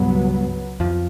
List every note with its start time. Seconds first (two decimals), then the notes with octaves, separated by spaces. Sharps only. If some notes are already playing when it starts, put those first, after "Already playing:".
Already playing: C#2 G2 B2 F#3 G3 B3
0.80 F2 F3